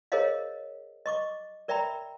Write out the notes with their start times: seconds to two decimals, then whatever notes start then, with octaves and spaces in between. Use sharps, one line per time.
0.12 G#4 A#4 C5 C#5 D#5 F5
1.06 D#5 C#6 D6
1.68 A#4 D5 E5 G5 A#5 B5